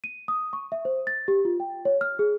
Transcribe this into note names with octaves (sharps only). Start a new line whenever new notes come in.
D#7
D#6
C#6
E5
C5
A6
G4
F4
G5
C#5
F6
G#4